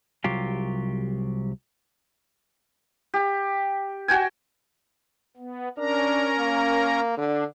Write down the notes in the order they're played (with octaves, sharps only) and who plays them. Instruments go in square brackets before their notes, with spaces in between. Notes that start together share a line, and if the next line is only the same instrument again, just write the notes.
[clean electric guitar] C2 F#3 F4 G4
[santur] G4
F#4 G5 G#5
[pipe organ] B3
[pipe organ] C#4 A#4 A#5 [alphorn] D4
[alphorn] A#3
[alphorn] D3 [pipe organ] D4